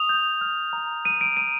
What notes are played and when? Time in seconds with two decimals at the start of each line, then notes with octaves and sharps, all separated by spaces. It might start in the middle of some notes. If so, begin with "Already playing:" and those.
Already playing: D#6 F7
0.09 G6
0.41 F6
0.73 A#5
1.05 F6 D#7
1.21 D7
1.37 A#5 D#7